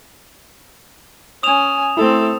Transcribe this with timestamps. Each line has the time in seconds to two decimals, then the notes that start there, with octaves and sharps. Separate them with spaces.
1.43 C#4 G#5 D#6 E7 F7
1.97 A3 C4 E4 A4